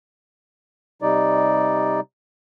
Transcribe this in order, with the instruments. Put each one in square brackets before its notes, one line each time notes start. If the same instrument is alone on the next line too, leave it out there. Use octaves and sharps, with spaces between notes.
[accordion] C3 G3 D#4 D5